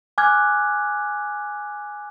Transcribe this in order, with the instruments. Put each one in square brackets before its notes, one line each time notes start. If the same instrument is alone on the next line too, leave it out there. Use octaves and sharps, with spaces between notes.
[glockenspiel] G#5 D6 F6 F#6 G#6